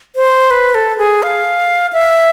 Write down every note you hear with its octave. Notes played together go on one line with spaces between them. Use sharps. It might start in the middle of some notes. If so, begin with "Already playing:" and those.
C5
B4
A4
G#4
F5
E5